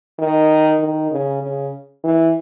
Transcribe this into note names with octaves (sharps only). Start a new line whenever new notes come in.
D#3
D#3
C#3
C#3
E3